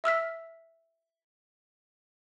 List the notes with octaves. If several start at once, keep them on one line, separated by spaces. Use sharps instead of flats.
E5 E6 F6 B6